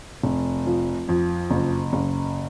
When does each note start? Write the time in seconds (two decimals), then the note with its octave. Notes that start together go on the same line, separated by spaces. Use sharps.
0.23 F1
0.66 F3
1.08 F2
1.51 F#1
1.93 F#1